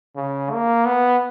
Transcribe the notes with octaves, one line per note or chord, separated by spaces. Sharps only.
C#3
A#3
B3